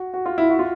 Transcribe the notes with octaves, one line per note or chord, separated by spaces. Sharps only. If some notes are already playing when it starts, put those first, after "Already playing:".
Already playing: F#4
F#4
F4
E4
F#4
F4